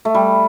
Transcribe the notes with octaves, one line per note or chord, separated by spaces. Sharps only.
A3
G3